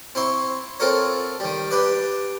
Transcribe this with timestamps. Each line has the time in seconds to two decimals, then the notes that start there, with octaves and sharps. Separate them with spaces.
0.15 C4 E4 C6 C#6
0.80 C4 F4 A4 A#4 C#5
1.40 D#3 G3
1.71 D4 G4 B4 D5